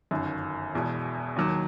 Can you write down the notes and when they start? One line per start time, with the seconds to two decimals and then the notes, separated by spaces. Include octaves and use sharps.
0.11 G1 F#2 D#3
0.74 E1 E2 B2
1.36 D#2 D#3 F#3